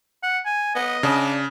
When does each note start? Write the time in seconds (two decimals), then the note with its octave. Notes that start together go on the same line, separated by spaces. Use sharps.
0.23 F#5
0.45 G#5
0.75 B3 D#5
1.03 C#3 D4